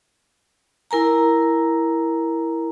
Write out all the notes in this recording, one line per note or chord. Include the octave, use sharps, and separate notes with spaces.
E4 A#4 G#5 A#5